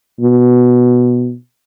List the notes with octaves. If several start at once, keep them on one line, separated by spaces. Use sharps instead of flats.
B2